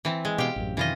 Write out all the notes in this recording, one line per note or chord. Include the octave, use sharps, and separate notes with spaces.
E3 C4
G#3
B2 G4 F5 G5
A1 F#2
F#2 C3 D#3 E3 F4 D#5